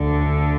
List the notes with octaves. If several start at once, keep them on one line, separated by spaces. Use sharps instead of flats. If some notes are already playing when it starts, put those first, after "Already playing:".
Already playing: D2 D3